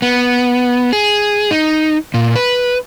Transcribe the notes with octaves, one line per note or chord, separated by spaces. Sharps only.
B3
G#4
D#4
A#2
B4